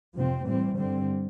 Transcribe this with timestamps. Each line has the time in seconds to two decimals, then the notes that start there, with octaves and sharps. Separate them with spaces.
0.14 F2 C3 F3 C4
0.46 A2 E3 G3 C4
0.77 G2 D3 G3 C4